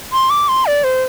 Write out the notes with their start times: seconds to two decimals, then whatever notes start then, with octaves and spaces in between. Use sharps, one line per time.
0.13 C6
0.30 D6
0.48 C6
0.66 D5
0.84 C5